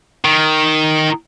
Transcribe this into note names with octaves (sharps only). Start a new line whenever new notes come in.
D#3